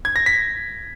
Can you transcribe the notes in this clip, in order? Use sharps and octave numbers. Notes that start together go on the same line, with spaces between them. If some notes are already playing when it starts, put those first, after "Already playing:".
G#6
A#6
B6